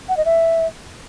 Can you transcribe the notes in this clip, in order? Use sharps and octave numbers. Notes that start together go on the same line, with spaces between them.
F#5
D#5
E5